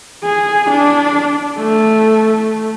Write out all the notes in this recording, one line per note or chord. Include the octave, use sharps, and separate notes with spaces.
G#4
D4
A3